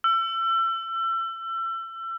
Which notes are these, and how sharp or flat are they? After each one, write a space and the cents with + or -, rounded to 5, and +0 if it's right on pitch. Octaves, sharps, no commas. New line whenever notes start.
E6 +35